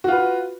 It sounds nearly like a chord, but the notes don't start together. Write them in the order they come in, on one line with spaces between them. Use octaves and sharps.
F#4 F4 B4